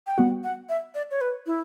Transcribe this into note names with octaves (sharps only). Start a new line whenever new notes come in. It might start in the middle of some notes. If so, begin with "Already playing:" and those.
G5
G3 B3 F#4 F#5
F#5
E5
D5
C#5
B4
E4